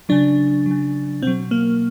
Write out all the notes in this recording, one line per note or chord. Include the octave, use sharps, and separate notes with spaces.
C#3 F#3 D4
C#3 F#3
B2 F#3 C4
A#3